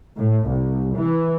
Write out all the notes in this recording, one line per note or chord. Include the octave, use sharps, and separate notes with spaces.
A2
C2
E3